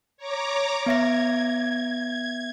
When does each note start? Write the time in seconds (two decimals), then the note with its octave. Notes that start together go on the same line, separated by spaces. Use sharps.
0.17 C#5 A#5 D6
0.86 B3 E5 G#6 A#6